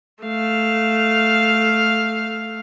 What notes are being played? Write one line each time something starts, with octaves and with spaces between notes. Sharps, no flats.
A3 F5